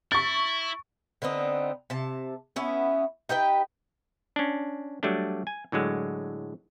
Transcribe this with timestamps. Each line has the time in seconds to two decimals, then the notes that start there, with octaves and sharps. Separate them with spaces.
0.12 E4 C#6 A6
1.22 D3 B3 C4 D#4
1.90 C3 A5
2.56 B3 C#4 E4
3.29 D#4 G4 B4 G5
4.36 C#4 D4
5.03 F#3 G3 A3 D4
5.47 G#5
5.72 A2 D3 F#3 G#3